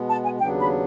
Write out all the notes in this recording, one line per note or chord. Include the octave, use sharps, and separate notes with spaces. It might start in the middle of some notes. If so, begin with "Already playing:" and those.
Already playing: B2 G#3 B3
A5
G#5
D#2 C#3 F#3 B3 D4 G5
B5